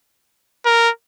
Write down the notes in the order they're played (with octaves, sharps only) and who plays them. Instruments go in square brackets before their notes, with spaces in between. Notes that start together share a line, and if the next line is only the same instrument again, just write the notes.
[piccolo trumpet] A#4